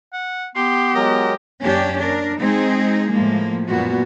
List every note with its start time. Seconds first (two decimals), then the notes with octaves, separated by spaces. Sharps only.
0.13 F#5
0.56 B3 G4 C6
0.95 F#3 G#3 A#4 D#5
1.63 F#2 A#3 C#4 D4 G4
1.99 D4 A#4
2.40 G#3 C4 D#4 G#4
3.10 A2 F3 G#3 A#3
3.68 F#2 A#2 B3 F#4